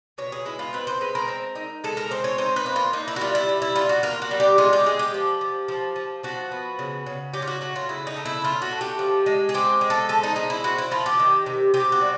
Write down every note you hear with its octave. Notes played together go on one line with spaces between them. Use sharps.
B2 C#5
G#4
G#3 E4
F4
C4 B4
C5
G#3 B4
A#4
C4
D#4
G#3 A4
A#4
C4 C5
C#5
D#4 C5
B4
A#3
F4
A#3 D#4
E4
F#4
G3 F4
E4
G3
E4
A#3 F4
F#4
A#3 F4
F#4
G3
G4
G#3 F4
G4
G#3 G#4
G4
F3
F3
F3
F3
F3 F#4
B3
C#3
C#3
F#3 G4
F4
F#4
A3 F#4
F4
C#3 E4
D#4
A3
E4
A3 F4
F#4
A3
G4
F3
G#3
G#4
C4 G4
G#3
A4
F3 A4
D#4
G#3 D#4
E4
C4 F#4
E4
F3 F4
G4
D#3
C3
C3 G4
F#4
G3